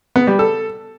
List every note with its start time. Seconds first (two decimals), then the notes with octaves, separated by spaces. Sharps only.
0.16 B3
0.27 G3
0.39 A4